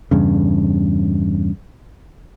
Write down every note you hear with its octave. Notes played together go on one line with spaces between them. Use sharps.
E2 G2 C#3